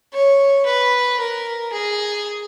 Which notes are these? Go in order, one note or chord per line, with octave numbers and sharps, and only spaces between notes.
C#5
B4
A#4
G#4